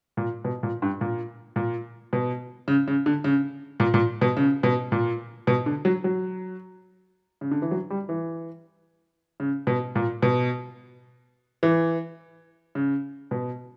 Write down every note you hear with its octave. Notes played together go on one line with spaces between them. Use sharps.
A#2
B2
A#2
G2
A#2
A#2
B2
C#3
C#3
D3
C#3
A#2
A#2
B2
C#3
B2
A#2
B2
D3
F#3
F#3
C#3
D3
E3
F#3
G3
E3
C#3
B2
A#2
B2
E3
C#3
B2